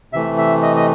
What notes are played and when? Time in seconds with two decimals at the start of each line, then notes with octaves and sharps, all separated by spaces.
0.13 C3 E3 A3 E5
0.38 E5
0.62 D#5
0.76 D#5